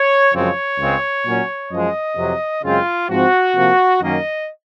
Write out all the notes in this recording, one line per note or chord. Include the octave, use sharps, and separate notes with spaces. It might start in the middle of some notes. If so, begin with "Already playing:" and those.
Already playing: C#5
F#2 C#3 F3 G#3 C4 C#5
C#2 C#3 G#3 C4
A#2 F#3 C#4
F#2 F3 G#3 D#5
F2 C3 F#3
F#2 C#3 G#3 C4 F4
G#2 F3 C4 F#4
C3 F3 A#3
F#2 D#3 F#3 A#3 C#4 D#5